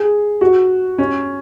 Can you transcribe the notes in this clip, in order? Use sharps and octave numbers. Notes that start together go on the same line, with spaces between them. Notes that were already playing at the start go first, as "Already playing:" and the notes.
Already playing: G#4
F#4
C#4